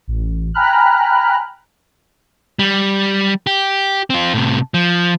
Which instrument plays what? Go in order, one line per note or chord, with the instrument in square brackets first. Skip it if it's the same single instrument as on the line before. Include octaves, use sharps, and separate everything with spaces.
[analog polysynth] A1
G5 G#5 A#5 B5 F6 F#6
[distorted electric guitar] G3
G4
C4 F4
A2 C3
F3